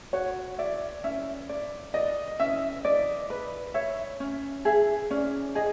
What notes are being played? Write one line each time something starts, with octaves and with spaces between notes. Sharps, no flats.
F#4 C#5
D5 E5
C#4 E5
D5
D5 D#5
C#4 E5
D5 D#5
B4
C#5 E5
C#4
G#4 E5
C#4 D5
G#4 D#5